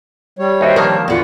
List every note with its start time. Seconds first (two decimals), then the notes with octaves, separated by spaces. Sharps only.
0.39 G3 C#5
0.61 D#2 D#4 F#4 C5 E5 G5
0.76 D3 D#3 F3 A#3 A#4 A5
1.08 E2 D3 E3 F4 F#4 F#5